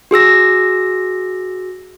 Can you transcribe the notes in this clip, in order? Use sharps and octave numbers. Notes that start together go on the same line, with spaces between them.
F#4 G#4 E6 A#6